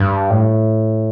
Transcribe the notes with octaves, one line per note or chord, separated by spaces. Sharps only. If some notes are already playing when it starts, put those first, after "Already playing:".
Already playing: G2
A2